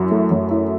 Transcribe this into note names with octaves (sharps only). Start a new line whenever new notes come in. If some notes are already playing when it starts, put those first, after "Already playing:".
Already playing: F#2 F#3 E4
A3
F#2
E4